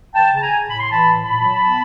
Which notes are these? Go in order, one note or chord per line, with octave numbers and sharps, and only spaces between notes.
E3 G5 A5
C#3 A5
G#5 A#5
C#3
A2 B5
C6
E3 A5 B5
A2
A#2 A5 B5
F#3
B3